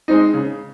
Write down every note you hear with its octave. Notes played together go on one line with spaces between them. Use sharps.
G#3 C4 D#4
C#3